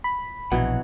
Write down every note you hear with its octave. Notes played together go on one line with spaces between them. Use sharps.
B5
A#1 B2 E3 F#3 F#5